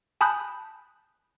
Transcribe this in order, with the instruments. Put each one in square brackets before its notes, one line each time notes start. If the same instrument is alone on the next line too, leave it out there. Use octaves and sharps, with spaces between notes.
[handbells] G#5 A5 B5 D#6 F#6 G6